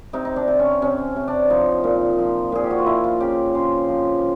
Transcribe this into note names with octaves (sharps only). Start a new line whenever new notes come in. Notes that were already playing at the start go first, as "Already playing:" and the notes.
C3 D#4
D#4
D4
C3
C#4
C3 C#4
C3
D4
F3 D#4
A#2
F3
A#2 G#4
G4
F#4
F4
F3 E4
F4
C#3 G4
C#3 C5
F3